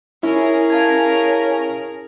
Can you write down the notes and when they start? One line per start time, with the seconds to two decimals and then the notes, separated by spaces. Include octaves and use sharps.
0.23 C#4 E4 G#4 A#4
0.70 F5 A5 G#6